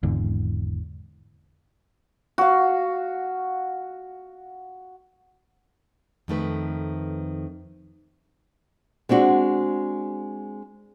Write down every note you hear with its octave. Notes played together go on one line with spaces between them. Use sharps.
G#1 E2 G#2 D3
F#4 F5
F2 D#3 A3 B4
G#3 C4 D4 F#4